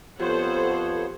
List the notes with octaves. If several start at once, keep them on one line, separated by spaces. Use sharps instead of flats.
F2 F3 B3 G4 A4 C5 C#5 F#5